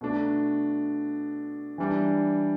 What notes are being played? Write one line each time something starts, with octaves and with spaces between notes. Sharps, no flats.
B2 A3 D4
E3 G3 D4